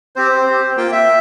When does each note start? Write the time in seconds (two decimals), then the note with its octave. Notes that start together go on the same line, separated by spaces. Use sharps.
0.16 C4 G4 C5
0.46 C4 G4
0.77 A#3 F4 G5
0.92 E5